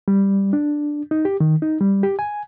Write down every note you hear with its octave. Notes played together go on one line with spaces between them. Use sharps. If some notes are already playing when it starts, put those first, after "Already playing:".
G3
D4
D#4
G4
D#3
D#4
G3
G4
G#5